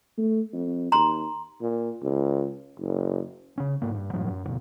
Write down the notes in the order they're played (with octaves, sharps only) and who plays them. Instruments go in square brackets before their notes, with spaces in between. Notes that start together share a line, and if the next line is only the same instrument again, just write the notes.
[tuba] A3
F2
[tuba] D#2 [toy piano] A#5 C6
[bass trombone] A#2
C#2
F#1
[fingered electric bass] C#3 C#4
G#2 A#3
G2
F#2 A2 F3 F#3
F#2
A1 D2 B2